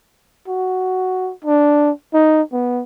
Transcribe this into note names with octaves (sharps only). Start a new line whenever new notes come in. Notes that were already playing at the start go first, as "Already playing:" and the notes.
F#4
D4
D#4
B3